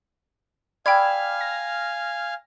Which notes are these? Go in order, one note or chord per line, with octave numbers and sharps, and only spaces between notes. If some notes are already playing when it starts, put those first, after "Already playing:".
D5 F5 G5 G#5 B5 E6 F6 G#6
A#6